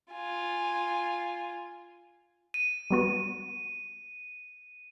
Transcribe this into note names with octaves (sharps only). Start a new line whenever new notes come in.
F4 G#5
D#7
G3 B3 F#4